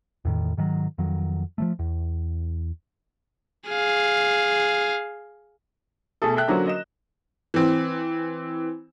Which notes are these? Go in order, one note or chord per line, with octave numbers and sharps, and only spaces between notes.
E2 A2 D#3
G#2 D#3 F3 F#3
F2 D#3 F#3
F3 F#3 A3
E2
G#4 F5
B2 A3 G#4 A4
A4 E5 G5 F#6
D3 F#3 A#3 C#4 F#4 C5
D#5 E7
E3 C4